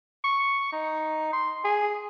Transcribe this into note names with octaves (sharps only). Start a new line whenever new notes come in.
C#6
D#4
C6
G#4